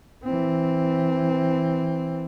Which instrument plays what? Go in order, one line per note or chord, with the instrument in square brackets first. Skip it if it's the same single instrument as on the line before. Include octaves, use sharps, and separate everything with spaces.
[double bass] E3 C4